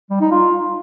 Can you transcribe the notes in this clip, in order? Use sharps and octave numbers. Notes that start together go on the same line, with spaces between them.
G3
D#4
F4